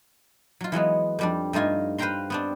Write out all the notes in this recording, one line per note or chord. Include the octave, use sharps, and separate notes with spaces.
F#3 F4
E3 F#3 G#3 B3
F2 G3 D4
G2 A3 D#4 F4 G#5
B4 C5 F5 G5 A#5 C6
B3 C4 D4